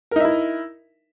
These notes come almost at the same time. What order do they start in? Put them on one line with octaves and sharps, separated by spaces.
A#4 D#4 E5 E4